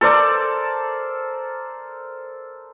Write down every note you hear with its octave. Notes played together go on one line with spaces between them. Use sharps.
A4 A#4 C5 D5